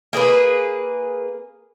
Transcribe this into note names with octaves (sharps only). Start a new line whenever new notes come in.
A#3 G#4 A4 B4